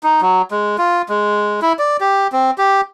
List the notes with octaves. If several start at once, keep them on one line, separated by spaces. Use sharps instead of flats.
D#4
F#3
G#3
F4
G#3
E4
D5
G4
C4
G4